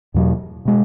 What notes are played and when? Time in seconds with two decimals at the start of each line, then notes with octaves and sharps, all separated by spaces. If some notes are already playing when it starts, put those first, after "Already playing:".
0.14 E2 B2 F#3
0.65 B2 G#3